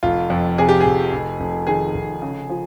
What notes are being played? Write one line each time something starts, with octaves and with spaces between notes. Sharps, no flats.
F1 F4
F2
C3 G#4
G4
F1 G#4
F1
F1
D#3 G#4
F1
C#3
F3